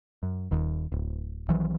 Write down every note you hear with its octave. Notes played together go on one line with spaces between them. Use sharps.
F#2
D#1 D#2
D1
B1 D#3 E3 F#3